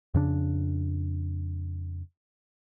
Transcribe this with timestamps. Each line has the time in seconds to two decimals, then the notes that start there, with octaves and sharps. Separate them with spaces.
0.14 F2 C#3 D4